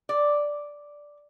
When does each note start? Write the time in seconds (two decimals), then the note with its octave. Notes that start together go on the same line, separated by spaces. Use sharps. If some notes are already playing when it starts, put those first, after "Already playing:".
0.09 D5